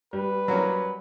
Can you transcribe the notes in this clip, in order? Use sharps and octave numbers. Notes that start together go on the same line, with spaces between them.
G3 B4
F#3 A#3 C#4